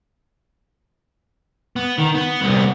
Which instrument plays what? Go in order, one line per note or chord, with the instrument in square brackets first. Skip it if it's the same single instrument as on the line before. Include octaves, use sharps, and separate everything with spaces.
[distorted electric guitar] B3
D#3
B3
C2 B3